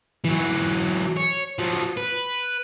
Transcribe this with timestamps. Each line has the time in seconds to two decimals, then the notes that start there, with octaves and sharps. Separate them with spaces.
0.25 E3 F#3
1.17 C#5
1.59 F3 F#3
1.97 B4